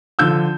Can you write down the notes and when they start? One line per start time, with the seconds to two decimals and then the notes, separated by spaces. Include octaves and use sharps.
0.19 D3 F3 E6 G6